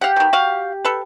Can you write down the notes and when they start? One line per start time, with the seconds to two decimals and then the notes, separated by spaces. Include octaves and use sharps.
0.01 G4 F5 F#5
0.16 B2 D#3
0.33 F#4 F5
0.85 A4 B4